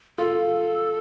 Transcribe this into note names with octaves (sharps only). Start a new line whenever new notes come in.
F4 A4